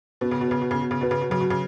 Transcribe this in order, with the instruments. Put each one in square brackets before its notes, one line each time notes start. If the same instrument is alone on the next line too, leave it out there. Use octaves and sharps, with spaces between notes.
[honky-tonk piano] B2 [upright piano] B3
[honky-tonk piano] C#3
B2
[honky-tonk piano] C#3 [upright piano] B4
[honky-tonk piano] B2
[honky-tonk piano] C#3 [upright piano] B3
[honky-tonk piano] B2
C#3
[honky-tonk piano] B2 [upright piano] B4
[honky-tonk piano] C#3
B2
[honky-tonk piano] C#3 [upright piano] F#3
[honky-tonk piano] B2
C#3